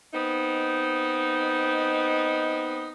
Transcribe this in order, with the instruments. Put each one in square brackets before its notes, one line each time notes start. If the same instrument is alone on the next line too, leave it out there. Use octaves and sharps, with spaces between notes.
[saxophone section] B3 C4 D#4